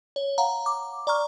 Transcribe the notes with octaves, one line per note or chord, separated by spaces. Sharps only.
C#5
F5 F#5 A#5
D6
D5 A#5 C#6 F6